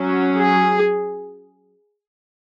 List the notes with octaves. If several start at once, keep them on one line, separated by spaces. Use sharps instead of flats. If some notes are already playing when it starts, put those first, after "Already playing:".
Already playing: F#3 C#4
G#4